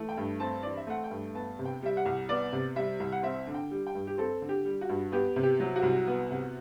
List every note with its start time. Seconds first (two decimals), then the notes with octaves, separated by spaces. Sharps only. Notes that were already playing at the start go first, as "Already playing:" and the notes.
Already playing: E3 A3
0.09 G5
0.17 G2
0.40 C4 A5
0.63 E3 D5
0.77 E5
0.87 A3 F#5
1.04 G5
1.10 G2
1.34 B3 A5
1.59 C3
1.65 G5
1.82 G3 E5
1.97 F#5
2.06 C2
2.29 B3 D5
2.52 C3
2.76 G3 E5
3.00 C2
3.12 F#5
3.23 C4 E5
3.47 D3
3.54 G5
3.71 G3
3.87 G5
3.95 G2
4.07 G4
4.18 C4 A4
4.42 D3
4.49 G4
4.65 G3
4.81 F#4
4.89 G2
5.12 B3 G4
5.36 C3
5.43 G4
5.60 F#3
5.76 F#4
5.82 C2
6.07 B3
6.31 C3